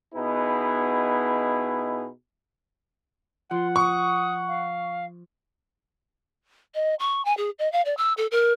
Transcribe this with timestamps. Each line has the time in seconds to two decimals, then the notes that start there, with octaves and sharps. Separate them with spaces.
0.15 B2 B3 D#4 E4 G#4
3.51 F3 F#5 C6
3.76 C#6 D#6
4.47 F5
6.75 D#5
6.99 C#6
7.25 G#5
7.37 G#4
7.59 D#5
7.72 F5
7.85 D5
7.97 E6
8.17 A4
8.31 A#4